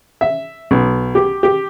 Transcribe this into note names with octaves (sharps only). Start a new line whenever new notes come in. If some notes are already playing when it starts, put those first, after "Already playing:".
E5
B1
G4
G4